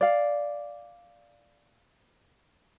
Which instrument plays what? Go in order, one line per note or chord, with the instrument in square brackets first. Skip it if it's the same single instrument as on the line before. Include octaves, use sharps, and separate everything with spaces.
[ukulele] D5 F5